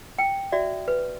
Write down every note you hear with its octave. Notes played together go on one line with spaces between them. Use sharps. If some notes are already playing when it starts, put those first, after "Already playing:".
G5
F#4 D5 E5
B4